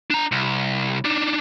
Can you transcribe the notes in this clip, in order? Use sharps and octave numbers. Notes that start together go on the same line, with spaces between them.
D4 A#5
C2
D4 D#4